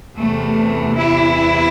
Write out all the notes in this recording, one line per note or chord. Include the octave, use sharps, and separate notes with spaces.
E2 C3 E3 A3
E4